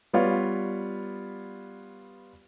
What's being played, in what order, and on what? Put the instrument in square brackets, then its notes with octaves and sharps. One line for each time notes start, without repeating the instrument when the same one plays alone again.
[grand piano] G3 B3 F4 B4 C#5 D5